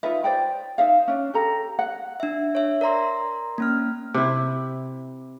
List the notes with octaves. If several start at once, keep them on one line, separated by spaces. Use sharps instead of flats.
D#4 F4 B4 E5
C5 D5 G5
D#4 C5 E5 F5
C#4 D4
G4 A4 A#5
F#5
D4 E5
C#5 E5
A#4 D5 A#5 C6
A#3 C#4 F6
C3 E4